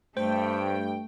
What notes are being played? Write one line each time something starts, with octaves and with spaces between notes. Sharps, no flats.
G2 A3 C5 G5